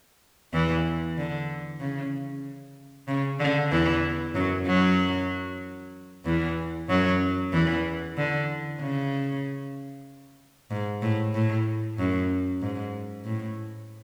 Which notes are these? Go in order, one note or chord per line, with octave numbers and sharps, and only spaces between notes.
E2 E3
D3
C#3
C#3
D3
E2 E3
F#2 F#3
F#2 F#3
E2 E3
F#2 F#3
E2 E3
D3
C#3
G#2
A2
A2
F#2
G#2
A2